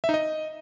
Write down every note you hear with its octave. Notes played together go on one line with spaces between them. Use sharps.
E5
D#4
D#5